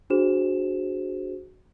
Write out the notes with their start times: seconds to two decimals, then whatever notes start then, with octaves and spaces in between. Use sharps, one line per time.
0.10 D4 F#4 G#4 C5 E7